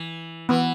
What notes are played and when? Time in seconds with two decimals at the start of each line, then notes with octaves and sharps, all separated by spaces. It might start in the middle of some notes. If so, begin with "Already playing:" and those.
Already playing: E3
0.49 E3 B3